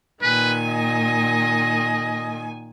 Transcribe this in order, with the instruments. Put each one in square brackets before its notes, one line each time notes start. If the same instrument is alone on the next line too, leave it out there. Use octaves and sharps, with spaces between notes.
[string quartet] A#2 D#3 G#5 [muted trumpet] B4
[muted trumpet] D#5